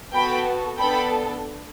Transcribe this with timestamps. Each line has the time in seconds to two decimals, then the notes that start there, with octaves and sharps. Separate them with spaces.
0.13 B3 F#4 A4 G5 B5
0.78 B3 D4 A4 G5 B5